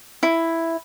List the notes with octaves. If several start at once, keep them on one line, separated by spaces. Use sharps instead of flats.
E4